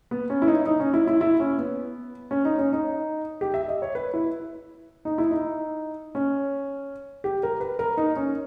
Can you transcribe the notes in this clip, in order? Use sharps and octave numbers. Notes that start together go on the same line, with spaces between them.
B3
C#4
E4
D#4
D#4
C#4
E4
E4
E4
C#4
B3
C#4
D#4
C#4
D#4
G4
E5
D#5
C#5
B4
E4
D#4
E4
D#4
C#4
G4
A#4
B4
A#4
D#4
C#4